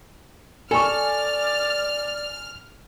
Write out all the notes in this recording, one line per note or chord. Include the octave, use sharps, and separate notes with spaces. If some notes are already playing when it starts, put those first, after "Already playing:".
A4 D5 G#5 C#6 F6